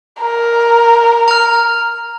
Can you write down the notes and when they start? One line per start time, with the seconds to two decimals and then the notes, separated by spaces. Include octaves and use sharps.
0.21 A#4
1.28 A#5 F6